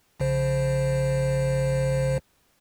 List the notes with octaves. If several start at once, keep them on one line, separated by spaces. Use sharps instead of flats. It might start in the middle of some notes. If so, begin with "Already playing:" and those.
A#1 C#3 C5